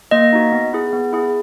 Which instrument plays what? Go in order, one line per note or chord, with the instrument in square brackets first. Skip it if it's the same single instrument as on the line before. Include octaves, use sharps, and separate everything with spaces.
[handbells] A#3 D#5
D#4 F#4
B3
E4 G#4
B3
E4 G#4